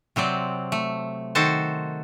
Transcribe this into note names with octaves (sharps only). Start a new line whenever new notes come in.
C3 F#3 C4 D5
A3
D#3 F#4 A4 C5 A5